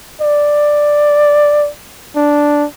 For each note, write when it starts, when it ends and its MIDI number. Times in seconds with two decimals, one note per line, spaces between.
0.21 1.69 74
2.16 2.66 62